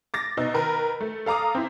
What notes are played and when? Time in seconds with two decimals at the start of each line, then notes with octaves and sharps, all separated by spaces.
0.14 D6 A6 A#6
0.37 B2 D#4 E6
0.54 D#3 A#4 B4
1.01 A3
1.26 A4 F5 A#5 D6 D#6
1.55 C4 E4